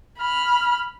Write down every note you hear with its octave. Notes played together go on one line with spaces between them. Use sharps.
B5 F6